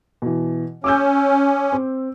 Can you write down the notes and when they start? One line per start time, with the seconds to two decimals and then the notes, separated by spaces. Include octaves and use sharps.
0.22 B2 E3
0.84 C#4 D6 E6 G6
1.72 C4